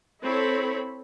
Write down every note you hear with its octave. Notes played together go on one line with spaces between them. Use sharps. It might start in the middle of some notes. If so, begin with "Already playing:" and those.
C4 E4 A4 C#5 B5